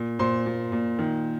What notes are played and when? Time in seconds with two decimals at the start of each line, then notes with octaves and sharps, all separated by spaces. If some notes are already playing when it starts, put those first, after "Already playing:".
Already playing: A#2
0.19 A#2 C5 C6
0.46 A#2
0.72 A#2
0.99 D#3